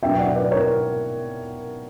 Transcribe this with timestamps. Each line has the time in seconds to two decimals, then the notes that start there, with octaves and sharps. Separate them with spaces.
0.03 B2 F#3 B3 D4 E5 G5
0.19 D5 F#5
0.35 B4 D5
0.51 A#4 C#5